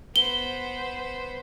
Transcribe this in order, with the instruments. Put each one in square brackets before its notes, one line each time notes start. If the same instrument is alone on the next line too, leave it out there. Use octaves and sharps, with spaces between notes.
[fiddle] B3 C5 [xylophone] G7